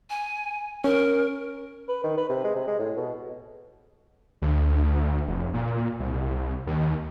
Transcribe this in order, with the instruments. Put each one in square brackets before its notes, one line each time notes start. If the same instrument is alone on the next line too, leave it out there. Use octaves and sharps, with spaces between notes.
[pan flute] G#5
[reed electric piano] C#4 [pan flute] A#4
[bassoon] B4
D#3
B4
C3
G#3
C3
G#3
A2
B2
[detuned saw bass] D2
D2
F1
A#2
C2
D#2